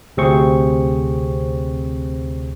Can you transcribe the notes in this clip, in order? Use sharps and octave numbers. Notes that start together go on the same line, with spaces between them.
D2 C3 C4 G#4 C5 C#6